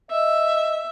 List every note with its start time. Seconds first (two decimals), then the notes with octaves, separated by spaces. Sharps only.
0.11 D#5 E5